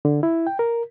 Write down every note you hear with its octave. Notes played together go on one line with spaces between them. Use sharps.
D3
E4
G5
A#4